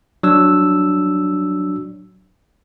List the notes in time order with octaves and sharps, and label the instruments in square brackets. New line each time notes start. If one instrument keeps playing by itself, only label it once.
[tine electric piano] F#3 D4 E6